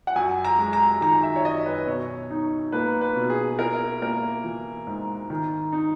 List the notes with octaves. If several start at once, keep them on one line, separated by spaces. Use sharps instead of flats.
F#5
F#2 G#5
A#5
G#3
A#5
D#3 A#5
E5
C#5
F#2 D#5
B4
B2 C#5
D#4
A#3 B4
B4
B2
G#4
E4 A#4
A#3 A#4
E3
G#2
D#3
D#4